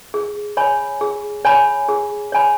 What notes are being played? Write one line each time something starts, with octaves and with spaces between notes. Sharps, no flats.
G#4
C#5 G#5 B5
G#4
C#5 G#5 B5
G#4
C#5 G#5 B5